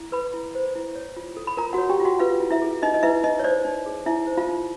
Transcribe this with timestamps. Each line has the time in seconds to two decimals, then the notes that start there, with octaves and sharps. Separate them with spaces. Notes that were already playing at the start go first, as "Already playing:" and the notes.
Already playing: E4
0.12 A4 B4 B5
0.34 E4
0.55 C5
0.75 E4
0.96 C#5
1.16 F4
1.37 A4
1.47 B5
1.57 F4 A#4 A#5
1.73 F#4 F#5
1.78 C#5
1.90 G4 G5
2.00 F4
2.05 F#4 F#5
2.19 F4 B4 F5
2.40 E4
2.51 E4 E5
2.62 G#4
2.82 D#4 E4 D#5
2.94 D#5
3.03 E4 B4 E5
3.23 D#4 E4 D#5
3.39 C#5
3.44 C5 D5
3.65 D#4
3.86 G#4
4.06 D#4 E4 E5
4.27 C5
4.37 F4 F5
4.49 D#4